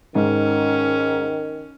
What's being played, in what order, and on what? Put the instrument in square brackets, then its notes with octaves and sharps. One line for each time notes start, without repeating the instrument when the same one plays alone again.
[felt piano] G#2 [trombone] D#3 [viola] C#4